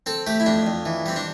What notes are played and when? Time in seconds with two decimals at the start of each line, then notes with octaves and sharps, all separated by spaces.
0.06 C4 A4
0.27 A3 G4
0.40 E4
0.46 F2 D4
0.67 F2
0.86 E3
1.06 G3 C4
1.16 D4